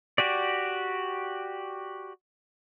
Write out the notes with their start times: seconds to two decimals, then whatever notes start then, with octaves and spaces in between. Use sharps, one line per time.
0.18 F#4 G4 D5